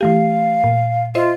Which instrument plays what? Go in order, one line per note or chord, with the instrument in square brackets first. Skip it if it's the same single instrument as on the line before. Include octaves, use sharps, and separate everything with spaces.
[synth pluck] E3 A3 G4 [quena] F5
[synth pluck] A#2
[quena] F4 [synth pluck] C5 D#5 E5